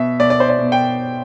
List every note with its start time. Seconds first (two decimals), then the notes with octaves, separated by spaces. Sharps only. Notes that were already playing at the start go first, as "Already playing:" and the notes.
Already playing: B2 E5
0.20 B2 D5
0.30 D5
0.40 C5
0.49 D5
0.59 B2
0.72 G5